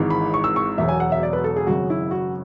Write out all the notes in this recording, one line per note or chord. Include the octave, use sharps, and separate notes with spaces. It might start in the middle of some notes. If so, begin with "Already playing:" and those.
Already playing: G#1 G#2 E3
B5
C#6
E6
C#6
E1 E2 B2 F#3 E5
G#5
F#5
E5
D5
B4
A4
G#4
G#1 F#2 C#3 F#4
E4
F#4